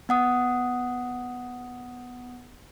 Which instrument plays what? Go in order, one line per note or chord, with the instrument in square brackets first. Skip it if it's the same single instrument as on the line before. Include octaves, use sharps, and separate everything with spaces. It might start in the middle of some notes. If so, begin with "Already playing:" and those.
[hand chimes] B3 F#5 D#6